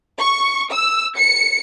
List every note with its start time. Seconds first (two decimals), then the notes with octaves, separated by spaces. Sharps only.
0.19 C#6
0.72 E6
1.16 C#7